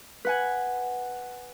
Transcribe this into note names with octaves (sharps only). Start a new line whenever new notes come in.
B4 F#5 G#5